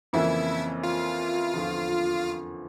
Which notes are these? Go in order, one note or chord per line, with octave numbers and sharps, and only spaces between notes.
F2 C#3 E3 A#3 E4
F4
E2 D3 F3